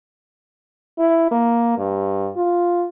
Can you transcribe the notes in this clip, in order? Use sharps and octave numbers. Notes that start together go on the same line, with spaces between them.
E4
A#3
G2
F4